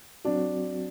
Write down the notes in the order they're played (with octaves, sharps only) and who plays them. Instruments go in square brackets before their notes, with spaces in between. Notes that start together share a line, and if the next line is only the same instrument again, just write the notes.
[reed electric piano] F#3 C4 F#4 [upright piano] D4